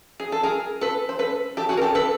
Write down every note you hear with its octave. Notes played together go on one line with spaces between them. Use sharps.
G#4
A4
G#4 A#4
A4 B4
C5
A4 B4
G4 A4
F#4 G#4
A#4
G4 A4
A4 B4